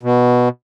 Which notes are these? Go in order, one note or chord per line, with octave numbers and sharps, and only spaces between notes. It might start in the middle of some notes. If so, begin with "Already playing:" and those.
B2